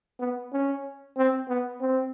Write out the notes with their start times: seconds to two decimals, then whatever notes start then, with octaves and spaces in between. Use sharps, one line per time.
0.20 B3
0.53 C#4
1.17 C4
1.49 B3
1.81 C4